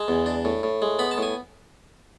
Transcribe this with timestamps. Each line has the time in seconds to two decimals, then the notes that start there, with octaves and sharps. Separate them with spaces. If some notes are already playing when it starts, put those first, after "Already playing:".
Already playing: G#3 A5
0.08 E2
0.26 D4
0.45 A2
0.63 A2
0.82 G#3
0.99 B3 B5
1.11 A5
1.18 A2 G#5